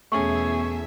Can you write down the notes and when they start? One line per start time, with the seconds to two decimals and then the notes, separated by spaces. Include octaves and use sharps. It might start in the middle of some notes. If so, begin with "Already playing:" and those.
0.12 E2 B2 A3 C#4 G#4 E5 C#6